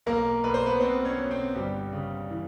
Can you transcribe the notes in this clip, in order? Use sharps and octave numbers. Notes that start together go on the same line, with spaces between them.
B1 A#3 A#4
B1 B4
C5
B3 B4
B2 C4 C5
C#4 C#5
B2
C4 C5
G1 G3 G4
C#3
E3